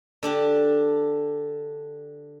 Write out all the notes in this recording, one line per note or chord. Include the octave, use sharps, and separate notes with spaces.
D3 D4 G4